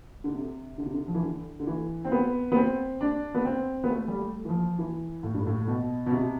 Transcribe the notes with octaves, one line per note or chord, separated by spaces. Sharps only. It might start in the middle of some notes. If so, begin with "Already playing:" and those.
D3
C3
D3
C3
D3
F3
E3
D3
D3
E3
C4
B3
B3
C4
D4
B3
C4
B3
A3
G3
A3
E3
F3
E3
A2
G2
A2
B2
B2
C3